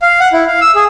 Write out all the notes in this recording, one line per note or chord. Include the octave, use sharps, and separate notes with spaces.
F5
F#5
E4
F5
E6
G#4